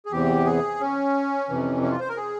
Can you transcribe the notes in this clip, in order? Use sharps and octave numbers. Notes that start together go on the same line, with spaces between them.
G#4
E2 C3 E3 G4
G#4
C#4
F2 C3 E3
C#4
F4
C5
A#4
G#4